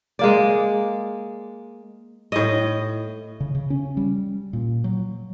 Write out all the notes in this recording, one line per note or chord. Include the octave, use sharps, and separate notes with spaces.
G#3 A#3 D5
A2 D#5
C#3
C#3
C#4
G3
A#2
F#3